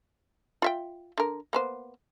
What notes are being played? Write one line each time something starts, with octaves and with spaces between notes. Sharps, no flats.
F4 E5 G5
D3 A#4
A#3 B3 C5